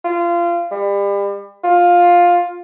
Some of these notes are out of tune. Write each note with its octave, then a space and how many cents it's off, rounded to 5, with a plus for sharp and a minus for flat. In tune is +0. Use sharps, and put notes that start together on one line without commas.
F4 -25
G3 +35
F4 +10